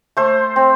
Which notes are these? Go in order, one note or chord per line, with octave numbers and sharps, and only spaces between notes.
A3 A4 C5
C4